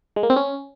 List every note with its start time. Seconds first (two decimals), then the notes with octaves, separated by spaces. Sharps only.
0.16 G#3
0.23 A#3
0.30 C4
0.36 C#4